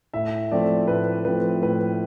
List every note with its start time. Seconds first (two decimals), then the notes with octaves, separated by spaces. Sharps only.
0.14 A2 E5
0.51 F3 A3 C4 D5
0.88 A2 B4
1.25 F3 A3 C4 B4
1.62 A2 B4